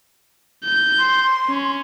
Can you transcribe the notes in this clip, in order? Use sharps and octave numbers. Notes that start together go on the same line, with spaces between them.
G6
C6
C#4